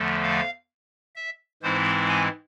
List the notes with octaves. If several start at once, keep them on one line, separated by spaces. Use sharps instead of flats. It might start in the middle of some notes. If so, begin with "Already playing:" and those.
Already playing: E2 D3 F3 A3
F5
E5
G#2 E3 G#3 C4 E4 C5
G#5